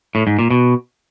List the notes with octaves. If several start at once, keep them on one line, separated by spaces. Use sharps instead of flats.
A2
G#2
A#2
B2